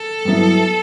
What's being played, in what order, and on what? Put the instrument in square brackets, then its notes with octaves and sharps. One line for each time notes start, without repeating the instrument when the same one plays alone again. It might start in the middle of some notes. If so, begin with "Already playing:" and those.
Already playing: [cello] A4
[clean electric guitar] G2 F#3 B3 E4